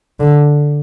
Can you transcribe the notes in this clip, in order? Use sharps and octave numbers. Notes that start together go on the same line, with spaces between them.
D3